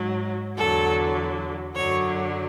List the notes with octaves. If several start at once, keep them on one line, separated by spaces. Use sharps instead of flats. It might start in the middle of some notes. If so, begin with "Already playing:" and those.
Already playing: G#2 F#3
E2 D3 F#3 A4
F#2 D3 F#3 C#5